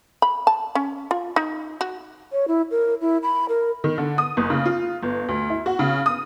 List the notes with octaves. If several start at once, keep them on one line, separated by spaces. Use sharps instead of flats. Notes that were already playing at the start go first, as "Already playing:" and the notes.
B5
A5
C#4
F4
D#4
F#4
C#5
E4
A#4
E4
B5
A#4
D#3
D3
D#6
F#1
C#3
F4
G1
D2
E4
F#4
C#3
D#6